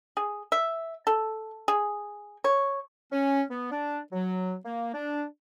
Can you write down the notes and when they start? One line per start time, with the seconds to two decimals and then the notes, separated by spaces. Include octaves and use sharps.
0.17 G#4
0.52 E5
1.07 A4
1.68 G#4
2.44 C#5
3.12 C#4
3.50 B3
3.71 D4
4.12 F#3
4.65 A#3
4.94 D4